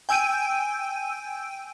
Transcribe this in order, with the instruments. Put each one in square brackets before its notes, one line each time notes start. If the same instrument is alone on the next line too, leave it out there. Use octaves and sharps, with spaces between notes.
[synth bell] G5 G#5 E6 G6 D7 D#7